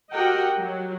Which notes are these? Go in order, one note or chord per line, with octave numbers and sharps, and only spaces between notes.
F#4 G4 A#4 D#5 F#5 G5
F#3